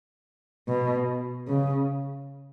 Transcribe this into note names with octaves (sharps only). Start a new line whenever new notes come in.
B2
C#3